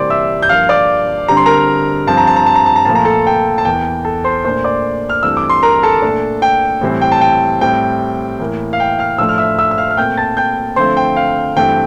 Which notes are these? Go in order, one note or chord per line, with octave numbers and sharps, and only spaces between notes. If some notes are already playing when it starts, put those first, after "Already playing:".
Already playing: C3 E3 G3 A#3 C5 D5 C6 D6
E5 E6
G6
G2 F3 A#3 F5 F6
D5 D6
D3 G3 C4 A#5
C6
A#4 A#5
G2 F3 C4 A5
A#5
A5
A#5
A5
A#5
A5
A#5
A#2 F3 A3 A5
A#5
A4 A5
G5
A5
E2 E3 A#3 G5
A4 A5
C5 C6
A#2 A3 D4 C5 C6
D5 D6
F6
G2 E3 A3 C4 E6
D6
C6
A#4 A#5
A4 A5
A#2 A3 D4
G5
A2 E3 G3 C4
G5
A5
G5
A2 G3 C4 G5
A2 E3 A#3
F5
G5
F5 F6
A2 F3 A3 D4 E6
F6
E5 E6
E5 E6
E6
F5 F6
F6
A#2 A3 C4 G5 G6
A5 A6
G5 G6
D3 F3 A3 C4 C5 C6
G5
F5
G2 E3 A3 C4 G5